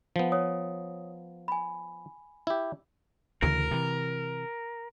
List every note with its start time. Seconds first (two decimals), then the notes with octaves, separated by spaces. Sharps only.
0.16 F3 B3
0.32 C#5 D#6
1.48 G#5 B5
2.47 E4 G4
3.42 D2 C#3 E3 A#4
3.71 C3 E3